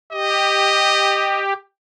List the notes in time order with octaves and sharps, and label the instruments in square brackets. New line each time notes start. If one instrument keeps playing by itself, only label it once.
[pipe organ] G4 [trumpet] D#5